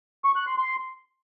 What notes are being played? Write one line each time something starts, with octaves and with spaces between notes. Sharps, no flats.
C#6
F#6
C6
C6